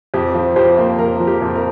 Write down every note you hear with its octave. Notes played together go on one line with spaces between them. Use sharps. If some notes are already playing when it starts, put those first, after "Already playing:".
F2 G4
F3
F2 G4 C5
A#3
F2 A#4
F3
G4
F2
A#4